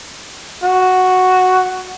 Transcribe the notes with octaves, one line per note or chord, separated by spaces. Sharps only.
F#4